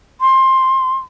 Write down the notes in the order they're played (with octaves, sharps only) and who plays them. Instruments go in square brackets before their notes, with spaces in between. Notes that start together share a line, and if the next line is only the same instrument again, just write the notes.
[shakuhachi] C6